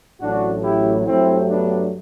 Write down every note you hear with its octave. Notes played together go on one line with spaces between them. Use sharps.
A1 A2 F#3 D4 F#4
E4 G4
G2 F#3 A3 C4 E4
B3 D4